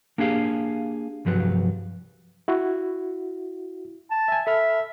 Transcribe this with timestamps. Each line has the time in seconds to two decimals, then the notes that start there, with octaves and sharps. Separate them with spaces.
0.18 A#3 D4 G4 G#4 F5
1.25 C2 G2 F3 F#3 B4
2.48 E4 F#4
4.11 A5
4.28 E5 G#5
4.47 A4 E5 B5 F6